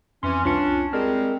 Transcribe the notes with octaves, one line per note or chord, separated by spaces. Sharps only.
F2 E3 C#4 C6
C2 C#4 D4 F4 C#7
G3 G#3 C4 G#4 A#4 F6